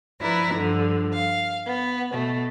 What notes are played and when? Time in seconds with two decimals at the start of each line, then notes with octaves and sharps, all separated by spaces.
0.21 F3 E4 B4 D5 A#5
0.54 G2 D3 F3
1.13 F5
1.66 B3
2.12 B2 A3